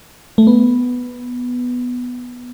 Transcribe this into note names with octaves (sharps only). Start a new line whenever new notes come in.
A3
B3